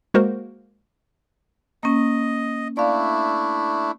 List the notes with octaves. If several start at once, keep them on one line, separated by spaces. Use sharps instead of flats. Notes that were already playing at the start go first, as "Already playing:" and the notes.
G#3 A#3 F#4 A#4 C5
A#3 C#4 D#5
A3 D4 E4 D5 F5